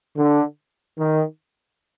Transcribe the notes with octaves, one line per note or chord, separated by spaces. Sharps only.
D3
D#3